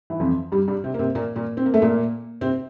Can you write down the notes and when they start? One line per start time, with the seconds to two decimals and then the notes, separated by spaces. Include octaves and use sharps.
0.10 E3
0.20 F2 F3
0.52 G2 G3
0.68 G2 G3
0.84 C3 C4
0.94 A#3
0.99 C3 C4
1.15 A#2 A#3
1.36 A#2 A#3
1.57 C4
1.66 A#3
1.74 A3
1.82 A#2 A#3
2.41 C3 C4